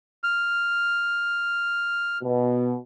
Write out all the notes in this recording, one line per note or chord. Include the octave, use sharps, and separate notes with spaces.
F6
B2